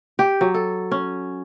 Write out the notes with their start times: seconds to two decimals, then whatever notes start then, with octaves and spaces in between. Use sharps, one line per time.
0.19 G4
0.41 F#3
0.54 A4
0.91 C#4